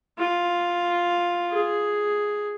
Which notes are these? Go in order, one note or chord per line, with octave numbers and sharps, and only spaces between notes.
F4
G#4